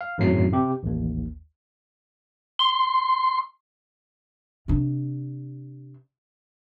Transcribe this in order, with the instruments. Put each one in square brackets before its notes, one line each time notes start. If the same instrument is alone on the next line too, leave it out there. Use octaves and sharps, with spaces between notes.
[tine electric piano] F5
G#1 F#2 A2 F#3 C7
C3 G4
A1 D#2
[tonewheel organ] C6
[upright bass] C3 D4